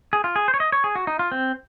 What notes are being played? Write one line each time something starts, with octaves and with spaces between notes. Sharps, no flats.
G#4
F4
G#4
C5
C#5
D#5
C#5
G#4
F#4
D#4
F4
C4